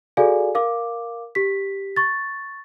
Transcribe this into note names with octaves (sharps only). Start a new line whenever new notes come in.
F#4 G#4 A4 D5 F5 G#5
A#4 F5 D6
G4 B6
C#6 A6